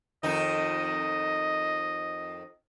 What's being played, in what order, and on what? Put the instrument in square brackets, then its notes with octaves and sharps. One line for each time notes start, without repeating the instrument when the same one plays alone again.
[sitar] F2 D#3 D#4 [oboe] D#5